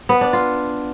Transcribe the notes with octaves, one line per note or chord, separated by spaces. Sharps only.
B3
D4
F4